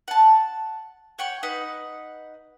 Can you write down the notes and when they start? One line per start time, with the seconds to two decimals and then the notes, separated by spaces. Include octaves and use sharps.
0.08 F#5 A5
1.19 C#5 F#5 G5 C#6
1.43 D#4 B4 F#5